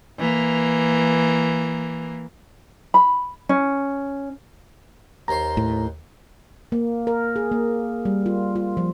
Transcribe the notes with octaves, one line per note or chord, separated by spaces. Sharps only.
E3 A#3
B5
C#4
D#2 C5 A#5 C6
A2
A#3
A#4
G#4
A#3
G3
F4
F4
F3